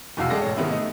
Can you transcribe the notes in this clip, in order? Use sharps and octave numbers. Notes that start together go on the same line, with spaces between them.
F1 B1 E2 F#4 F5 E6
G#3 G#4 A4 D5 G5 A#6
A1 C#5
C3 D#3 B3 E4
A3 D#4